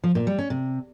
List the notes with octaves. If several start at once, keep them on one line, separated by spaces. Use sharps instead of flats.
F3
A#2
G3
C#4
C3